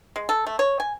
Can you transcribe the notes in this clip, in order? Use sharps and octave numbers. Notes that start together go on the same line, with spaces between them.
G#3
A4
A3
C#5
G#5